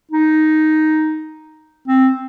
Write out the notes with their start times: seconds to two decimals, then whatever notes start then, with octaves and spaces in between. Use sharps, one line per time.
0.12 D#4
1.88 C4